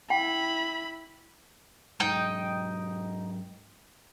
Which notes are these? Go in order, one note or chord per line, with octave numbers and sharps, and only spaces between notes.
E4 G5 B5
G#2 F#3 G#3 D#4 D#5 G5